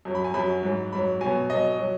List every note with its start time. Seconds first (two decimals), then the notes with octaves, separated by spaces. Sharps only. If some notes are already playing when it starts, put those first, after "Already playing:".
0.05 F#2 F#3
0.15 B5
0.24 G#5
0.34 F#2 F#3 B5
0.63 G#2 F#3
0.92 G#2 F#3 B5
1.21 B2 F#3 G#5
1.50 B2 F#3 D#5
1.79 F#3